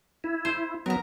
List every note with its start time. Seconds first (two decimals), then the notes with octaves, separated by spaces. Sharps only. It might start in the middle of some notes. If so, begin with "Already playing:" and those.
0.24 E4
0.45 C5
0.86 F#3 B3 A#4 A#5